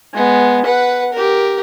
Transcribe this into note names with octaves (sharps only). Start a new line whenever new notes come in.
G#3 B3
B4 F#5
G4 A#4